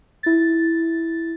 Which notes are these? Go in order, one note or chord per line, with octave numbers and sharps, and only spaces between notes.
E4 A6